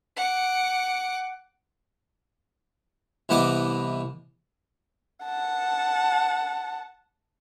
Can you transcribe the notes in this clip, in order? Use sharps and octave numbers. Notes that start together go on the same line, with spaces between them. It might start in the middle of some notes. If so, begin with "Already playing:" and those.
F#5 D6
C2 E3 B3 D#5 F#5 D6
F#5 A5